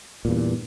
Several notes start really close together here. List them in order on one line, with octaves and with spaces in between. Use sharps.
A#2 E2 G2